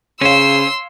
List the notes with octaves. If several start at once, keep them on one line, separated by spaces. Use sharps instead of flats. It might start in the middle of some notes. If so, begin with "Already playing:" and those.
C#3 C#4 C5 C#5 F5 C6 E6